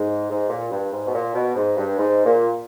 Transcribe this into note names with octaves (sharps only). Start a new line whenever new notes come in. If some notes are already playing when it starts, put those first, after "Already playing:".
Already playing: G#2
G#2
A#2
G2
G#2
B2
A#2
B2
G#2
G2
G#2
A#2